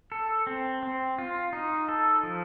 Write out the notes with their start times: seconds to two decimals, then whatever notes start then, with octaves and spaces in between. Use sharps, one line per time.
0.12 A4
0.47 C4
0.83 C4
1.19 F4
1.53 D#4
1.89 A4
2.23 F3